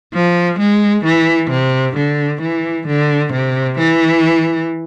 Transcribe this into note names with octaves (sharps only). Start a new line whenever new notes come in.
F3
G#3
E3
C3
D3
E3
D3
C3
E3